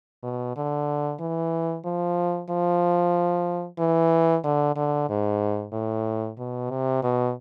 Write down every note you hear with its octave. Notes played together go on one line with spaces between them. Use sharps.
B2
D3
E3
F3
F3
E3
D3
D3
G#2
A2
B2
C3
B2